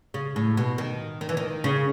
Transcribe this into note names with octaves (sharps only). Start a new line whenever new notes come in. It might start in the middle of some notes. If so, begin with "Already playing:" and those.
C#3
A2
B2
D#3
D#3
E3
D#3
C#3